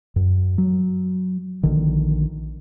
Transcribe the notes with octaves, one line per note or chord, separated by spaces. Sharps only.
F#2
F#3
A#1 D3 D#3